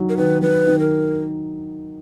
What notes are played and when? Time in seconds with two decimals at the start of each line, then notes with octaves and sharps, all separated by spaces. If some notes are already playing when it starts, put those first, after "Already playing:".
Already playing: D#3 F#3 D#4
0.09 A#4
0.17 D#3 B4
0.42 F#3 B4
0.67 D#3
0.79 A#4